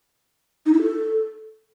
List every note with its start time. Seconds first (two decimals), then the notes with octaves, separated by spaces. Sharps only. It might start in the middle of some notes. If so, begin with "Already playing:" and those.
0.66 D#4
0.74 E4
0.82 A4